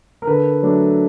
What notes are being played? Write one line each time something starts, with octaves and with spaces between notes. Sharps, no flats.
A#4
D3 B4
F#3 A3 D4